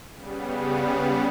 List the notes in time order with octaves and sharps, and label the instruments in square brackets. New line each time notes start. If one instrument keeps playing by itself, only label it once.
[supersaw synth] C#3 G3 B3